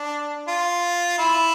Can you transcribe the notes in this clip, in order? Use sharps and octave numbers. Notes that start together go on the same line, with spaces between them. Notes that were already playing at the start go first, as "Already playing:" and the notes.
Already playing: D4
F4
E4